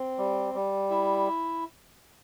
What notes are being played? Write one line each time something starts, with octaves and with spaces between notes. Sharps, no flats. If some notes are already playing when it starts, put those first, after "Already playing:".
Already playing: C4
G3
G3
E4